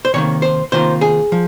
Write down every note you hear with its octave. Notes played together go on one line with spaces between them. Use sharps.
C5
C3 D#3 A#3 C#5
C5
C3 D#3 A#3 F4 C5
G#4
F3